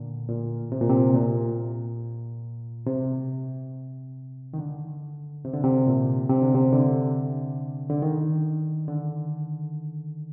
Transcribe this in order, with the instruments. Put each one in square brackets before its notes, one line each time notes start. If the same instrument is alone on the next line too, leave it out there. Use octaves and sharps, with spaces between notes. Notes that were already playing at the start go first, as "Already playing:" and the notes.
Already playing: [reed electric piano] A#2 D3
A#2
C3
A#2
C3
A#2
C3
D#3
D3
C3
D3
C3
A#2
C3
D3
C3
D3
D3
D#3
D3